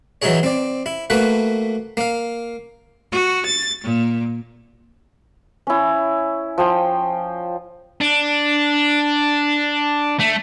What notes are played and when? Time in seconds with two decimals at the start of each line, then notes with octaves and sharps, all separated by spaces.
0.22 E3 F#3 D#4 E4 G#4 C#5
0.43 C4 D5
0.86 E4
1.10 A3 A#3 F#4 B4
1.97 A#3 F5
3.11 F#4
3.44 A6
3.81 A#2
5.67 C#4 E4
6.58 F3 G5
8.01 D4
10.19 A3